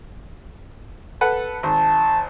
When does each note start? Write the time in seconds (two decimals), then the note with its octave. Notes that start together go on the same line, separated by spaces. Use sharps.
1.21 A4 B4 F#5
1.63 G#1 A5